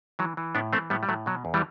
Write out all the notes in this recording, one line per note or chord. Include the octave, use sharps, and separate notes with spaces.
E3 F#3
E3
A2 B3 D4
E3 A3 C4
A2 G3 B3
G3
A2 F#3 A3
B2 F#3
E2
E3 G3